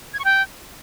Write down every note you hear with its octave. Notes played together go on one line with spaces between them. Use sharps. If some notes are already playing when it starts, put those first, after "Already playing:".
G#6
C#6
G5